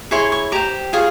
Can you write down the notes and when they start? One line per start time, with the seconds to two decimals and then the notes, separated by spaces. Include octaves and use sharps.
0.11 E4 G#4 C#5 C6
0.32 C#6
0.52 G4 C5 A#5
0.93 F4 G#4 C#5 G#5